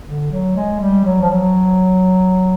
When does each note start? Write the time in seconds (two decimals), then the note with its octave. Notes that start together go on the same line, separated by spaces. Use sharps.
0.06 D3
0.31 F#3
0.56 G#3
0.81 G3
1.05 F#3
1.21 F3
1.30 F#3